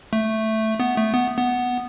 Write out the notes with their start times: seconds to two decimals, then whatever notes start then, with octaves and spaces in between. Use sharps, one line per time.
0.13 A3
0.80 B3
0.97 A3
1.14 B3
1.38 B3